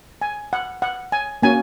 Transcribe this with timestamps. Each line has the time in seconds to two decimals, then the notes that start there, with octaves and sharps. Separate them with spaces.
0.22 G#5
0.53 F#5
0.82 F#5
1.12 G#5
1.42 A#3 C#4 F#4 G#5